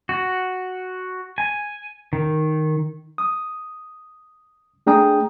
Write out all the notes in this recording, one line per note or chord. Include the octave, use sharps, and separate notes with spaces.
F#4
G#5
D#3
D#6
A3 D4 G#4 G5 A#5 D#6